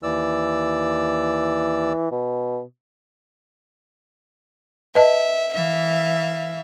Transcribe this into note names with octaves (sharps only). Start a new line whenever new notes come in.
D#2 E3 D5 E6
B2
B4 D#5 E5 A5
E3 E5 F5